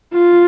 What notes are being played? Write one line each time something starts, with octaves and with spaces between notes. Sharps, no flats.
F4